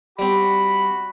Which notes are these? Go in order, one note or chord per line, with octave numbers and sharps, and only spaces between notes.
G3 C4 F#4 B5